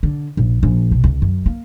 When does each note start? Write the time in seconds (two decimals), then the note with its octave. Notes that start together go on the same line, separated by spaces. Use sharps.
0.03 D3
0.37 A#1
0.63 A#1
0.91 B2
1.04 C#2
1.22 F#2
1.46 A#3